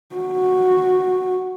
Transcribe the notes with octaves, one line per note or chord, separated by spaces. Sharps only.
F#4